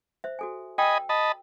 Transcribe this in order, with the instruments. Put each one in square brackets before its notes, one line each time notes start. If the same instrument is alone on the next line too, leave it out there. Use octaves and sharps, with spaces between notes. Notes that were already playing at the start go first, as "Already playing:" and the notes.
[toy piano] C5 E5
F#4 A4 G#5
[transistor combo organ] D#5 G#5 B5 [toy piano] G5 E6
[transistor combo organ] D#5 A5 B5